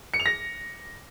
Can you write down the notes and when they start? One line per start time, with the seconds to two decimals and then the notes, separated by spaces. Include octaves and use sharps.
0.14 C#7
0.20 F7
0.26 A#6